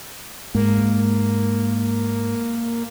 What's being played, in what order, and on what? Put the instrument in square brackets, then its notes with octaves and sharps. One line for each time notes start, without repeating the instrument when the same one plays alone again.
[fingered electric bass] G#2 [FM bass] A#3